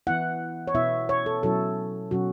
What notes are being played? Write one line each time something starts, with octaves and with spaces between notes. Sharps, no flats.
E3 B3 E4 F#5
C#5
B2 B3 E4 E5
C#5
A4
B2 F#3 C#4 E4 A4
B2 F#3 C#4 F#4